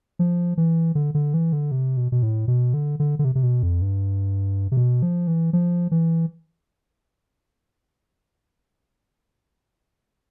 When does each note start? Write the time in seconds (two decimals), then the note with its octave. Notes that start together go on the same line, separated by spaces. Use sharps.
0.19 F3
0.58 E3
0.95 D3
1.15 D3
1.34 E3
1.53 D3
1.71 C3
1.97 B2
2.12 B2
2.23 A2
2.48 B2
2.74 D3
3.00 D3
3.19 D3
3.25 C3
3.35 C3
3.43 B2
3.63 F2
3.82 G2
4.72 C3
4.77 B2
5.02 F3
5.27 E3
5.53 F3
5.91 E3